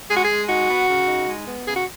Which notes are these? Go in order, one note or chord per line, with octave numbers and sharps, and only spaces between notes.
G#3 G#4
F#4
G#4
G#3
D#4 F#4
B3
C#3
D#4
G#3
B3
C#3 G#4
F#4